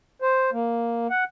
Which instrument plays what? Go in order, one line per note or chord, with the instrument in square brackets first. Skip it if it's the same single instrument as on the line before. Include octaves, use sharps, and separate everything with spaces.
[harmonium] C5
A#3
F#5